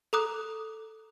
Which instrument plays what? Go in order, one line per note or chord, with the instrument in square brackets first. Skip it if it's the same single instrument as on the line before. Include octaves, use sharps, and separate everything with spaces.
[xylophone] A4 A#5 D6 D#6 F#6